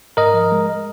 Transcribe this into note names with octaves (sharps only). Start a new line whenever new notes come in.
G#2 A#4 D#5
F3
G#3